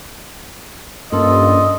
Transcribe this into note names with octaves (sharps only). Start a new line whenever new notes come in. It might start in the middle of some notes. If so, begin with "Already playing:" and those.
G2 A#3 C#4 F4 A4 A#4 D#5